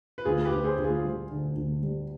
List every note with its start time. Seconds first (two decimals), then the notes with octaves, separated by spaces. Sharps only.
0.18 B4
0.25 D2 F4 G#4
0.45 G4 B4
0.51 D2
0.64 G#4 C5
0.78 D2
0.84 F4 G#4
1.05 G3
1.31 D3
1.56 D2
1.83 G3